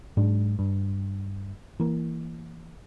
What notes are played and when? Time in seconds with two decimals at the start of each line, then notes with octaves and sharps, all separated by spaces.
0.17 G#2 F#3 G#3 D4
0.59 G2
1.80 E3 A#3